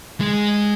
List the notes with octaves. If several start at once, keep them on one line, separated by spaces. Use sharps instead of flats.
G#3